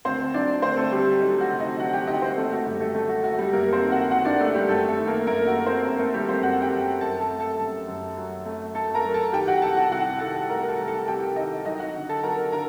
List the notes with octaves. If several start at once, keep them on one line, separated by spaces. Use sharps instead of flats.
D2 C4 C5
F#3 D4 D5
D2 C4 C5
A3 A4
D2 G3 G4
F#3 D#4
F#4
C3
D#4 D#5
F#3 F#4 F#5
G4 G5
D2 D#4 D#5
C4 C5
F#1 A3 A4
F#4
F#2 G3 G4
A3 A4
F#2 A3 A4
F#4
F#1 F#4
G3 G4
F#2 A#3 A#4
C4 C5
D#3
F#4 F#5
D#3 F#4 F#5
D4 D5
F#1 A3 A4
G3 G4
F#2 A3 A4
A3 A4
D#3
A#3 A#4
F#2 A#3 A#4
F#4
F#2
C4 C5
F#2 A#3 A#4
A3 A4
D#3 G3 G4
C4 C5
F#2 F#4 F#5
G4 G5
F#2
F#2 A4 A5
A4 A5
A3
A4 A5
F#2
F#2
F#3
A3
A3 A4 A5
A#4 A#5
F#3
A4 A5
D#3 G4 G5
F#4 F#5
C2 A4 A5
F#4 F#5
C2 F#4 F#5
D#3 A4 A5
A3 A#4 A#5
A4 A5
C2
A4 A5
C2 G4 G5
D#3 D#4 D#5
F#3 D#4 D#5
F#4 F#5
D3
A4 A5
F#3 A#4 A#5
D3 A#4 A#5